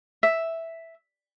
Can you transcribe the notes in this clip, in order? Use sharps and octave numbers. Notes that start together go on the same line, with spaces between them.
E5